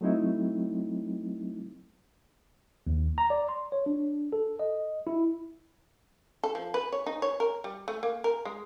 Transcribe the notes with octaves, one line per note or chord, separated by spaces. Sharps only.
F#3 A3 C4 D#4 E4
D#2
A#5
D5
C6
C#5
D4
A4
D#5
E4
A4
F3
B4
C#5
D#4
C#5
A#4
G3
A3
A#3
A#4
G#3